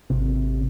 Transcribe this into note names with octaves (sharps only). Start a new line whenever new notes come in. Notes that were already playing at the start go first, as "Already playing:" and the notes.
G#1 C3